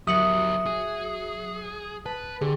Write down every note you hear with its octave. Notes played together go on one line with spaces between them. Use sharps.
F#3 F#4 G4 A#4 E5 D#6
G#4
B4 A5
D3 G4 G#4